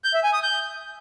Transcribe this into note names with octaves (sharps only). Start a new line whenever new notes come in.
G6
E5
G#5
D#6
G6